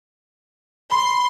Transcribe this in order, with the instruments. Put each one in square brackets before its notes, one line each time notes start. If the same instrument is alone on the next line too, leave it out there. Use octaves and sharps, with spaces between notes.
[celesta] B5 [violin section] C6